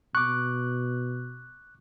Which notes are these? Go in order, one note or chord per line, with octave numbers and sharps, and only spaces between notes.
B2 C#6 D6 F#6